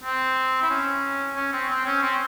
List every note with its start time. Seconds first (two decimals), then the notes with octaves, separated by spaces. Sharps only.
0.04 C4
0.62 E4
0.70 C#4
1.36 C#4
1.53 C4
1.69 C4
1.86 C#4
2.03 C4